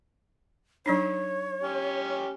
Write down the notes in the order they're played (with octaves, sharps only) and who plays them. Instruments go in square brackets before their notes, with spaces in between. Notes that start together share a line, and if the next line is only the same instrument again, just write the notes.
[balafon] F#3 D4 D#4 [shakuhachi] C#5
[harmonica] C#4 G4